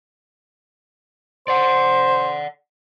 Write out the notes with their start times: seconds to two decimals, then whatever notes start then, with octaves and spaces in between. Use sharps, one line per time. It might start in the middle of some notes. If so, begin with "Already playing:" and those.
1.48 C5 D5 F#5